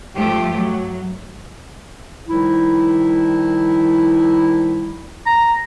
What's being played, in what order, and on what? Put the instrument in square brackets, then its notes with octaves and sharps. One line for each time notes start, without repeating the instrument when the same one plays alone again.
[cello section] G2 F3 A3 G4
F#3
[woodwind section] D#3 F3 G3 D#4 E4
[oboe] A#5